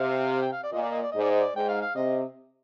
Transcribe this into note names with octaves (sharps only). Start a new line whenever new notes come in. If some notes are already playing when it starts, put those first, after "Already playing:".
Already playing: C3 F5
F5
G5
F5
D5
A#2 D#5
D5
D#5
D5
G#2 D#5
D5
D#5
D5
G#2 G5
F5
F5
C3 D#5